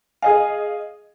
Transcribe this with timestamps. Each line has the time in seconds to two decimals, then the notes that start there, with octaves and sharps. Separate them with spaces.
0.23 G#4 D#5 F5 G#5